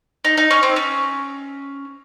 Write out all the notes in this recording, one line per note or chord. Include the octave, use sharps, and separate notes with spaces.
D#4
D#4
C#4
C4
C#4